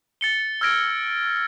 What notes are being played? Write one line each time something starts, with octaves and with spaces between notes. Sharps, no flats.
A6 C#7 G7
E6 F6 G#6 A#6 D7